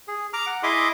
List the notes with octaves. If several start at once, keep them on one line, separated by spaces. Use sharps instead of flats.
G#4
A#5 D6 F6
F#5
E4 G#4 D#5 E5 C6 D6